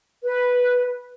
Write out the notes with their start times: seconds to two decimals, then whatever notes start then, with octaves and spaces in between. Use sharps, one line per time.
0.23 B4